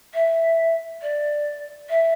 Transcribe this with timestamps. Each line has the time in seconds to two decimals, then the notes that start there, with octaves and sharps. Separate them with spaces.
0.14 E5
1.02 D5
1.89 E5